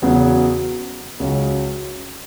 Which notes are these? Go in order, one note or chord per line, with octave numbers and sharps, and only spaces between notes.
E2 C#3 F#3 B3
C#2 C#3 F#3 C#4